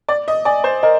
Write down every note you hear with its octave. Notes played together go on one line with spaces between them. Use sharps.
D5 D6
D#5
D5 G#5
C5
A#4 D#5